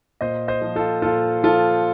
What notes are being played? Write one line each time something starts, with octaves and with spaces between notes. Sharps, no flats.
A#2 C5 D#5
C5 D#5
F3
F4 A4
A#2 F4 A4
F3 F4 A4